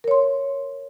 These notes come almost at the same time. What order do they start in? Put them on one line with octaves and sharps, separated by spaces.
A#4 C#5 C6